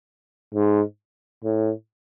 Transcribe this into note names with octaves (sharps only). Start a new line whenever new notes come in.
G#2
A2